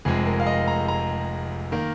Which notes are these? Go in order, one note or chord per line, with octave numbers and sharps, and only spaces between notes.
F1 F2 C3 G#3 G#4
A#4
F5
D#5
A#5
A#5
D#3 A#3 A#4